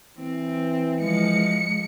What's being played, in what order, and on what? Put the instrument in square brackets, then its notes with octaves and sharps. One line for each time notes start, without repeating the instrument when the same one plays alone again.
[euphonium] E3 [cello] C4
[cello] F3 G#3 [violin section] C#7